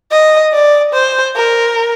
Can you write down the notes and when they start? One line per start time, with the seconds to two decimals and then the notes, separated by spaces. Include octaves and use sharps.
0.11 D#5
0.53 D5
0.93 C5
1.36 A#4